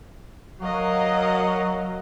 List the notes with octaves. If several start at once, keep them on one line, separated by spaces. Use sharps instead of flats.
F#3 F#4 A#4 D#5 F5